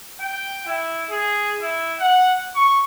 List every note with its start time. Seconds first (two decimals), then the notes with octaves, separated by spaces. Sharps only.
0.21 G5
0.66 E4
1.10 G#4
1.61 E4
1.99 F#5
2.55 C#6